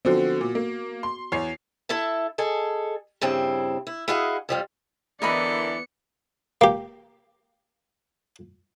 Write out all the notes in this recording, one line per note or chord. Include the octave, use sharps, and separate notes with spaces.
D3 F3 B3 C4 F#4
A#2
A#3
C6
E2 C#5 C7
E4 A4 E5 A5
G#4 A4 D#5
G2 C#3 C4 E4
E4
E4 F#4 G#4 D#5 F5 F#5
F2 F3 G3
D3 E3 B3 A#4 D5 D#5 B5 C#7
A#3 G4